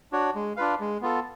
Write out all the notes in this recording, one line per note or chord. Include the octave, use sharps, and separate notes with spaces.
D4 F#4 C#5
G#3
D4 F4 B4 F5
G#3
B3 F4 A4